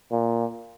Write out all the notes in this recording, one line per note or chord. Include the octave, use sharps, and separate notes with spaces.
A#2